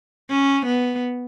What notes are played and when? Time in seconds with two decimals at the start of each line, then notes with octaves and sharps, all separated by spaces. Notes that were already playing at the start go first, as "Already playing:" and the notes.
0.30 C#4
0.66 B3